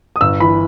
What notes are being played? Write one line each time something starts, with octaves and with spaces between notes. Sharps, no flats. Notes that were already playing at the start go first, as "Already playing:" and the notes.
D#6
G1 E6
E3 B5